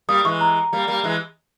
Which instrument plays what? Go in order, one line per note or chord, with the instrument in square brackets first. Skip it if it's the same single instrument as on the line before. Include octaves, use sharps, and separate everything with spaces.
[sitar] G3 A#3 [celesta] D#6
[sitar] E3 G#3 [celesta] C#6
[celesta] A#5
[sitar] G3 A#3
G3 A#3
E3 G#3